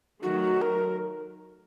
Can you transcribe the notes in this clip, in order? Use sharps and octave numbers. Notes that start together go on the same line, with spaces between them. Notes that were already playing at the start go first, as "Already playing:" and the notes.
D#3 F#3 A3 F#4
A#4